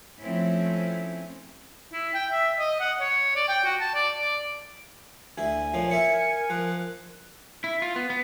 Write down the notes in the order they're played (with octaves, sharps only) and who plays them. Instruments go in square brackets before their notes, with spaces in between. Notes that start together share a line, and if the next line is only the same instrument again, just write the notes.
[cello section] F3 A3 C4 C#4 E4
[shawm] E4
G5
E5
D#5
F#5
C#5
D5
G5
F#4
A5
D5
D5
[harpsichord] D2 E4 [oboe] G#5
[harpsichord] A#2 F3 [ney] C#5
[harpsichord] E4 E5 [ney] A#4 [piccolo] C#7
[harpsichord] F3 [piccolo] F#6
[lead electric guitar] E4
F4
B3
B3